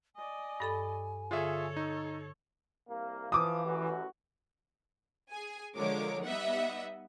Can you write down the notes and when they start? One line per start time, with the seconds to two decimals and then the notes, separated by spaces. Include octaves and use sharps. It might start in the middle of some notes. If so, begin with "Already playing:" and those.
0.16 D5 D#5 G#5
0.60 G2 A4 B5
1.31 D3 F4 G#4 A4 C#5 E5
1.77 D#4
2.88 C2 A#3
3.32 E3 F3 D6 D#6
3.65 A1 F#2 F#4
5.32 G#4 G#5
5.76 D3 F3 G#3 A#4 C#5 D6
6.25 G3 B3 D#4 D#5 E5 F#5